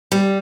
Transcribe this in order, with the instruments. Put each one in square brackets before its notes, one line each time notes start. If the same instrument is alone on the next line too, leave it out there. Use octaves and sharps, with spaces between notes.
[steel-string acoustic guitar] G3